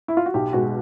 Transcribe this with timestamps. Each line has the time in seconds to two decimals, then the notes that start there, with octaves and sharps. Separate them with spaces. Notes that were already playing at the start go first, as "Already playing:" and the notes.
0.08 E4
0.17 F4
0.26 F#4
0.34 B1 G4
0.53 B2 G#3 F#4